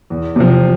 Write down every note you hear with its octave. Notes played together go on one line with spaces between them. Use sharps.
E2
C3 F3